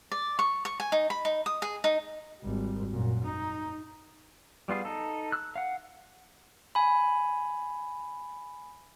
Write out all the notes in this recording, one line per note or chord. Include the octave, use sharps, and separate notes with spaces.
D5
C#6
C#6
G#5
D#4
B5
D#4
D#6
G#4
D#4
G#1 G3
F#2 A#2
D#4
G3 B3 F4 G#4
D#4 A4
E6 F#6
F5 F#5
G#5 B5